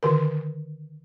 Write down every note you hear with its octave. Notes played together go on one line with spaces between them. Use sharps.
D3 D#3 A#4